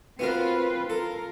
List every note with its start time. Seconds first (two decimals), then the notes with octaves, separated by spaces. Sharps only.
0.19 B3 C4 F4 F#4 A#4 B4
0.90 F4 A4 A#4